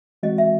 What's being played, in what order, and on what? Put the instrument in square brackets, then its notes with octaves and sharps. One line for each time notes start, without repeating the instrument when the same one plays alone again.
[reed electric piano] E3 G#3 C4 F#4 [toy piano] D#5
[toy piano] E5